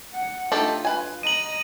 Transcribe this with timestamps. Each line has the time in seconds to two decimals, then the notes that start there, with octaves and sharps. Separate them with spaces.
0.14 F#5
0.52 A3 D4 D#4 F4 G4 A4
0.85 B4 G#5
1.23 D#5 A#5 D#7 F#7